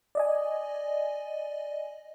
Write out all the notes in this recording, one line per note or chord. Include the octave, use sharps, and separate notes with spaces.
D5 D#5 G#5